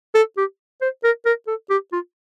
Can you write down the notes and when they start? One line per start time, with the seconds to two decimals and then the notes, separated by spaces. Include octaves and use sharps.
0.15 A4
0.37 G4
0.81 C5
1.04 A#4
1.26 A#4
1.48 A4
1.70 G4
1.92 F4